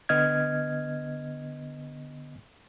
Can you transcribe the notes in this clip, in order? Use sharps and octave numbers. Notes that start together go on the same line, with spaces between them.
D3 B3 D#5 F6 G#6